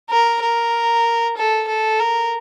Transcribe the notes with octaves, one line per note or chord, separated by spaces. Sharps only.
A#4
A#4
A4
A4
A#4